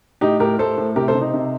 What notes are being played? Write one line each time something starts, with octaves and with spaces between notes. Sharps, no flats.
A2 D#4 G4
A2 G4 A#4
A2 A4 C5
A2
C3 G4 A#4
A4 C5
C3
D#4
C3